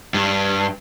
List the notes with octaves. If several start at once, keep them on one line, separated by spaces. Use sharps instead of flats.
G2